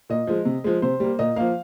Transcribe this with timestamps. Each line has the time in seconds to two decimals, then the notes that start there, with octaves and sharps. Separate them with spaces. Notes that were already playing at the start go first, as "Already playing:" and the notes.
0.09 A#2 D#5
0.27 F3 G#3
0.45 C3
0.64 F3 G#3
0.82 C3 C5
1.00 G3 A#3
1.19 A#2 D#5
1.36 F3 A#3 F5